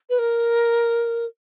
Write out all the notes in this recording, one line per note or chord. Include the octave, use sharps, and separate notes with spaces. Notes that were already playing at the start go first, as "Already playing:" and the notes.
B4
A#4